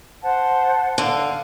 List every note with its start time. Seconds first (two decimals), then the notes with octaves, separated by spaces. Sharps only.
0.22 C5 F#5 A5
0.98 D3 F5